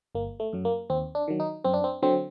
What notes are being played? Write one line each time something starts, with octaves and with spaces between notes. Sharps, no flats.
G1 A#3
A3
F#2 F#3
A#3
D#2 C4
D4
D#3 F#3
D#4
F#2 C4
D4
C4
D3 F#3 C4